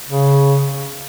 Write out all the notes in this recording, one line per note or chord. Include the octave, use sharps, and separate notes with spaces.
C#3